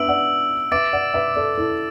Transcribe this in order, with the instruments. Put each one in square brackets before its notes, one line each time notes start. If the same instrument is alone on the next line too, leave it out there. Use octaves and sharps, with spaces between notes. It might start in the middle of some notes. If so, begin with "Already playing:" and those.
Already playing: [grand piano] B3 D4 B4 E5 [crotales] E6 D7 F#7
[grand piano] D5 F#5
[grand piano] B4 E5 [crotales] D6 A6 D7
[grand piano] D5 F#5
B4 E5
A4 D5
E4 A4